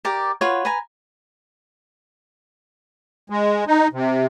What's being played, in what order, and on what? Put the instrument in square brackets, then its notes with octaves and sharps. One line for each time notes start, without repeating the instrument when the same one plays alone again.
[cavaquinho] G4 A#4 D5
F4 F#4 B4 C#5
B4 G#5 A#5
[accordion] G#3
D#4
C3